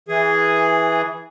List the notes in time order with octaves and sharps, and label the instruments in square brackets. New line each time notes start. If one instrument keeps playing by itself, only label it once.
[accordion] E3 G#4